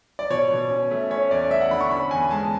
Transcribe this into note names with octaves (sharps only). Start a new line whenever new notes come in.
D5
B2 C#5
B2
C#4
A3
C#4 C#5
E2 D5
A3 E5
F#5
D3 B5
C#6
C#4 B5
E2 G#5
G#3 A5